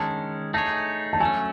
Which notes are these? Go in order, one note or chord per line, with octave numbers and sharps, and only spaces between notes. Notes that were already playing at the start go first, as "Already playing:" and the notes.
Already playing: D#3 G#3 C#4 A5
A3 D#4 G#4 C#5 A5
A5
F#3 A3 C#4 G#5